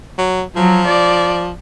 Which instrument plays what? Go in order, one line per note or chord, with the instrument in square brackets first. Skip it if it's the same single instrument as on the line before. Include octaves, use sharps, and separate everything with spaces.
[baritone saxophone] F#3
[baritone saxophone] F3 [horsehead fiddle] F#3
[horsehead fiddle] D5